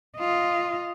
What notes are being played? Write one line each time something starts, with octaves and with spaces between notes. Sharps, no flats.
F4 D#5